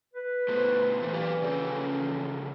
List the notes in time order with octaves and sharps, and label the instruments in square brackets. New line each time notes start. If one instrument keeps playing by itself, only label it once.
[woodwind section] B4
[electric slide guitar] B2 A3 [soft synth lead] C5
[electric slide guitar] A#2 A3 [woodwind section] E3
[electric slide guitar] G4 B4 F5 [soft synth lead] D5
[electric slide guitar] C#3 F3 A4 [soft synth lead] C#4